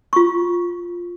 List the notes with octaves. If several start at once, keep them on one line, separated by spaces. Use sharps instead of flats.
F4 C#6